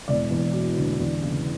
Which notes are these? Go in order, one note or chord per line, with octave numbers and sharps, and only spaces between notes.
E1 D5
E2
F#3
D3
E2
C#3